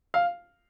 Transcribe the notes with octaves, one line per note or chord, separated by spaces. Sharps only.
F5